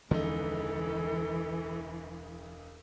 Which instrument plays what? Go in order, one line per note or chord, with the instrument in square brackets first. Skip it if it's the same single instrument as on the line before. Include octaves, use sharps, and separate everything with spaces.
[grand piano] E1 C#2 D#4 [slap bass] D3 F3 G#3 [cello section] E3 [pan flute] A4